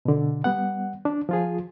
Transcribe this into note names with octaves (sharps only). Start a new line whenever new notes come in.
B2 D3
G3 B3 F#5
D4
F3 F4 G#4